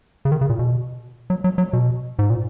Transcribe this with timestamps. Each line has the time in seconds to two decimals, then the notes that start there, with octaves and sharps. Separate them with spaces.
0.25 C#3
0.32 D#3
0.41 C#3
0.49 A#2
0.59 B2
1.30 F#3
1.44 F#3
1.58 F#3
1.73 B2
2.19 G#2
2.30 A#2